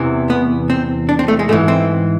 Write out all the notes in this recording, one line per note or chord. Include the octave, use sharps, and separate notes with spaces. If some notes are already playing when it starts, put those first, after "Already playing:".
Already playing: E2 C3 E3
B3
C4
D4
C4
A3
G#3
G#2 E3 A3
C4